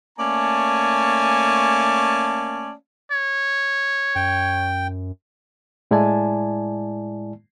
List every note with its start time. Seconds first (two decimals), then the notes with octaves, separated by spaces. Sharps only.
0.18 A3 A#3 C#4 D5 G#5 A5
3.11 C#5
4.15 F#2 G5
5.91 A2 G#3 E4 D5 G#5 A5